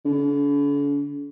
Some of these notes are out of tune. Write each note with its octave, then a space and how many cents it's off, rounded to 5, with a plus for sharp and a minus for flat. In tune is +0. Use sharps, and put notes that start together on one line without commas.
D3 -45